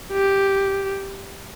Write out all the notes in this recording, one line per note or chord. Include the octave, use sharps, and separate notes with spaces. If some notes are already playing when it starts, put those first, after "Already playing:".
G4